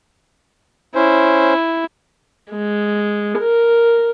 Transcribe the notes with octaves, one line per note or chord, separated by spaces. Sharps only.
C#4 E4 C5
G#3
A#4